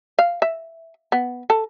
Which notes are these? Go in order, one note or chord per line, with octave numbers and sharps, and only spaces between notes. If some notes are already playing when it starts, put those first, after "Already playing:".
F5
E5
B3
A4